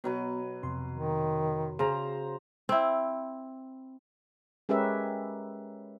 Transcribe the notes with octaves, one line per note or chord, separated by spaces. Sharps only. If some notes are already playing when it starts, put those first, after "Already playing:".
B2 F#3 B3 B4
F2 C3 C6
D#3
C#3 C5 A#5
C4 E4
G#3 C#4 G4 A#4 B4 E5